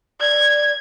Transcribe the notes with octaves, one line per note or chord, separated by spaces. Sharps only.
D5 G#6